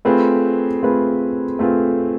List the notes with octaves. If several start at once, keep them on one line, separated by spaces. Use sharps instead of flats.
A3 C4 F4 G#4 B4
A3 C4 F4 G#4 B4
A3 C4 F4 G#4 B4